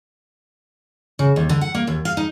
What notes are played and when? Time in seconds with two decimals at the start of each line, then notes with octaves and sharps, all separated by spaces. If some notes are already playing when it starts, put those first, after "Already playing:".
1.19 C#3
1.36 D#2
1.49 D3
1.61 F#5
1.74 A#3
1.87 D#2
2.05 F5
2.17 D#4